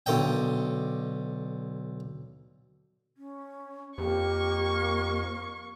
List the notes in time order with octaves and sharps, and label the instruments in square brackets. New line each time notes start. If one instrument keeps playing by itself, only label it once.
[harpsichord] B1 D3 D#5 G5
[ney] C#4
[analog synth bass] F2 [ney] A#3 [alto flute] G4 [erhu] C#6